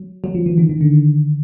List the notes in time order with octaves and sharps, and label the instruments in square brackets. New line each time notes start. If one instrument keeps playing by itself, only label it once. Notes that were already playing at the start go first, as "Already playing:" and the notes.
Already playing: [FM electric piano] F#3
F#3
F3
E3
D#3
D#3
D3